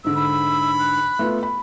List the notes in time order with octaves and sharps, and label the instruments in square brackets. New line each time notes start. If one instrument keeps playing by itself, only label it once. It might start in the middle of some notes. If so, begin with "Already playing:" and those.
[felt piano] G#2 D3 [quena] E6
[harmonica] B5
[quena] F#6
[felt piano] A3 B3 F4
B5